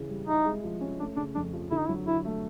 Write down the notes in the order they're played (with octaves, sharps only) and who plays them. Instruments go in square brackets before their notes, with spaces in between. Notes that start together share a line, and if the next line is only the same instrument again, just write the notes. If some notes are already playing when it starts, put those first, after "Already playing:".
Already playing: [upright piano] C#3 E3
G3
[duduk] D#4 [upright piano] E4
[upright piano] G#3
F3
C#4
[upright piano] A3 [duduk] D4
[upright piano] C#3 [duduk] D4
[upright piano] F2 [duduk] D4
[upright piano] F3
[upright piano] D3 [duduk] E4
[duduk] D#4
[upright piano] F#3 [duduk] E4
[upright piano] D3 [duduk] E4
[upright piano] A3